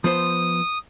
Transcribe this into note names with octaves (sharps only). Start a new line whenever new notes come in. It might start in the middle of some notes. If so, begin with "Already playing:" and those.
F3 B3 C5 D#6